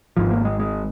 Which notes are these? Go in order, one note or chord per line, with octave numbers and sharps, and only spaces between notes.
G#1 G#2 F3
A#3
G#3
G#3